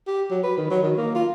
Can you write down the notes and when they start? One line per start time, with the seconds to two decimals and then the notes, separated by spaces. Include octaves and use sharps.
0.07 G4
0.30 F#3
0.43 B4
0.58 D#3
0.70 F#3
0.82 D#3
0.97 A#3
1.15 F4